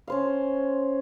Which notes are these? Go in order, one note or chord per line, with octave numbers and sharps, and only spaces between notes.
C#4 C5 F5